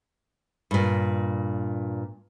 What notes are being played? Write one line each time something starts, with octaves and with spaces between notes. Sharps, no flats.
G2 A#2